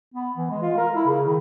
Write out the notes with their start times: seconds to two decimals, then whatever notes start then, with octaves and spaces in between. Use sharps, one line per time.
0.14 B3
0.37 E3
0.50 G#3
0.62 F4
0.78 A#4
0.95 E4
1.07 C#3
1.27 D#3